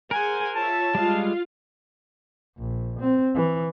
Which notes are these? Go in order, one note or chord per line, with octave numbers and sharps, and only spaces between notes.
G#4 A#4 C5 F#5 G#5
F4 C#5 E5 A5
G3 G#3 F4 F5
A#1
C4
E3